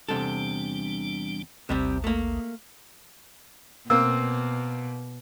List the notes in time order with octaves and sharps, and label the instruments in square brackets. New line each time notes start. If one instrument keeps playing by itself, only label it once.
[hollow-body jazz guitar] E2 C3 A4 [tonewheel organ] G3 D4
[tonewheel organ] A1 D#2 [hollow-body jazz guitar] C3 G3 C4
[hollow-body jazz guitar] A3 A#3
[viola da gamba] B2 [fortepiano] A#3 C4 [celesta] E6